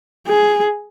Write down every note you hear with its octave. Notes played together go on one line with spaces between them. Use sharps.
G#4